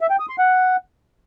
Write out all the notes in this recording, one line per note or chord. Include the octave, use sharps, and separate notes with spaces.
E5
G5
D#6
C6
F#5